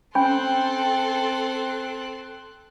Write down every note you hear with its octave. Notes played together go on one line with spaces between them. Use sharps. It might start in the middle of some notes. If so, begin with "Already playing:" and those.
C4 C#4 A4 G5 G#5 B5 C6 F#6